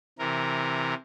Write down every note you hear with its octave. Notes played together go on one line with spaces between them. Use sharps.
C3 E3 A#4